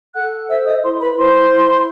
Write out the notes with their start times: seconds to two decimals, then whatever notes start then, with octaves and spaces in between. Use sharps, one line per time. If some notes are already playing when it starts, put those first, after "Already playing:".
0.15 A4 F#5 F#6
0.49 C5 E5 E6
0.66 D#5 D#6
0.83 E4 C5 C6
1.00 B4 B5
1.17 E4 C5 C6
1.51 E4